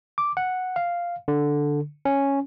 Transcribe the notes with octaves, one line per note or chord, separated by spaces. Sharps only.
D6
F#5
F5
D3
C#4